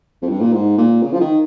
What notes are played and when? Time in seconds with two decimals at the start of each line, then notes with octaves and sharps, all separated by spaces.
0.22 F2
0.29 G2
0.41 A#2
0.53 G#2
0.78 A#2
1.02 C#3
1.13 F3
1.21 D#3